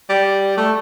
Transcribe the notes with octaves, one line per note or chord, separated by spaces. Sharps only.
G3
A3